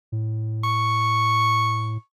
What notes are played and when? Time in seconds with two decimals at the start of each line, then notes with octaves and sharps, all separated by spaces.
0.12 A2
0.64 C#6